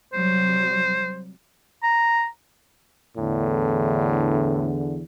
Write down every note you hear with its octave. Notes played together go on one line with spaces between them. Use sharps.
C3 F#3 G3 C5
A#5
E2 A2 D3